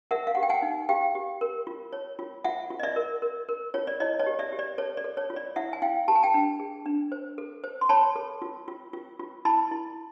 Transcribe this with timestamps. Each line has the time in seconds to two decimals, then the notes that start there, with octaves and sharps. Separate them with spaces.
0.11 A#4 E5 F#5
0.27 F5
0.35 G4 F#5
0.43 G5
0.49 F#5 G#5
0.62 D#4
0.89 G4 F5 G5
1.15 G4
1.41 A#4
1.67 F4
1.93 C#5
2.19 F4
2.44 F4 E5 F#5
2.70 F4
2.79 D#5
2.83 D5 E5
2.96 A#4
3.22 A#4
3.49 A#4
3.74 F4 C#5
3.87 D5
4.00 E4 C#5 D#5
4.19 C#5 D#5
4.26 G4
4.39 D5 E5
4.53 G4
4.59 D5
4.78 A4 C#5
4.97 D5
5.04 A4
5.17 C#5
5.30 F4
5.36 D5
5.56 E4 E5 F#5
5.73 G#5
5.82 E4 F5 G5
6.08 G4 A5
6.15 G#5
6.23 G5 A5
6.34 D4
6.60 G#4
6.86 D4
7.12 C5
7.38 A4
7.64 C5
7.81 C6
7.89 C#5 A5 B5
8.16 A4
8.42 F4
8.68 F4
8.93 F4
9.19 F4
9.45 E4 A5 B5
9.71 E4